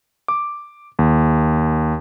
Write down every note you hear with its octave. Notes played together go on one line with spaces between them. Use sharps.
D6
D#2